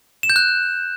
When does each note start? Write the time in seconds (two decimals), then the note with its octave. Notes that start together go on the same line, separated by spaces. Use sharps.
0.23 E7
0.30 G6
0.36 F#6